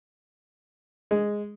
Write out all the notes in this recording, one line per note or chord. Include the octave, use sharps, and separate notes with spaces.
G#3